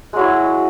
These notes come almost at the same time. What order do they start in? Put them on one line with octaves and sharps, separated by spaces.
G#3 F#3 E4